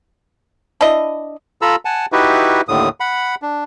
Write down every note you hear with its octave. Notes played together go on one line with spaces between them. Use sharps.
D4 E4 D#5
F4 A4 A#5 B5 E6
F#5 G#5 A5
D#4 E4 F#4 G4 B4 E5
D#2 A2 D3 D#6
F#5 B5
D4